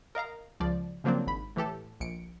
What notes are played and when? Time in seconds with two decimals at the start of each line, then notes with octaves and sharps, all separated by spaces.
0.15 A#4 D#5 F5 A#5
0.60 C#2 F3 D5
1.04 C#3 F3 F#3 A#3 C4 D4
1.27 G#1 B5
1.56 A2 E3 G4 A4
2.00 A#1 C#7 D7